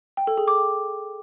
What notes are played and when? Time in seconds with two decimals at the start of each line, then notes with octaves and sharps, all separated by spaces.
0.17 G5
0.27 A4
0.37 G#4
0.48 D6
0.58 G5